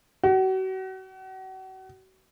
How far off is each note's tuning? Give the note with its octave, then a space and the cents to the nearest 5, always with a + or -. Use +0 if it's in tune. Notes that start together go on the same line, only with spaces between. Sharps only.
F#4 +35